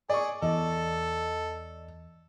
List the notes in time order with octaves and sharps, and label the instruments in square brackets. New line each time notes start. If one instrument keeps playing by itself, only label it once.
[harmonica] G#4 [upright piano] D5 C#6
[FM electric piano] E2 [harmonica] A4 [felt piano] D#5